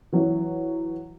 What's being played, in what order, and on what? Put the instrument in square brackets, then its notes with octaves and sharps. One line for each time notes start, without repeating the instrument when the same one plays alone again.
[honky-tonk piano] E3 F#3